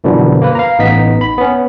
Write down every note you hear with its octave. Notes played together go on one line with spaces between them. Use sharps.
F#2 B2 D3 E3 F3 G3
A#3 A#4 B4
F5 A#5
A1 B3 D#4 D#5 B6
B5
B3 C#4